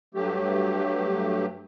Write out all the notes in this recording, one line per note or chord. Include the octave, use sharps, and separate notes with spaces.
G2 F#3 A3 G4